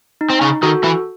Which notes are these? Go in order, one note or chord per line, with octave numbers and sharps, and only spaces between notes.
D#4
C4
C#3 C#4
D#3 D#4 F#4 A4
E3 E4